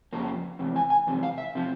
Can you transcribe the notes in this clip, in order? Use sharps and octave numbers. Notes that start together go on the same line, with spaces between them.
F2 C#3 F3 A#3
E2 C3
G#5
G#5
E2 C3
F5
E5
C3 F3